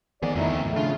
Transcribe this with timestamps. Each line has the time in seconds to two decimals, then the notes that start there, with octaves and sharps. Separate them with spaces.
0.23 D#3 F3 B3 D#4 G#4 D5
0.35 F2 C#3 A3 D#4 E4
0.48 D2 C4
0.64 G#2 A3
0.76 C#3 D4 F4